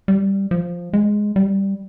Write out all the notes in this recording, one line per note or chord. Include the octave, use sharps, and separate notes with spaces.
G3
F3
G#3
G3